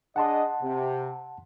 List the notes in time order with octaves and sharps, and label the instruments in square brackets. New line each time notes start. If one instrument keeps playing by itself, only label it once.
[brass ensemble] D4 G#4 D#5 [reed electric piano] F#5 A5 C6
[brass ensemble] C3